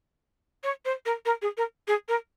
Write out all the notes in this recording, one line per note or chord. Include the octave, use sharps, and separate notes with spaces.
C#5
C5
A#4
A#4
G#4
A#4
G#4
A#4